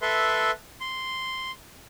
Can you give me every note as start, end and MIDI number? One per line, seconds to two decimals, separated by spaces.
0.02 0.51 69
0.02 0.51 71
0.02 0.51 76
0.02 0.51 84
0.81 1.51 84